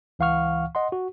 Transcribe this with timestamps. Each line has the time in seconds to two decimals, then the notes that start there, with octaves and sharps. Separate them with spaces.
0.19 C#2 E3 F5 F#5 C#6 F6
0.75 D#5 F#5 C6
0.92 F#4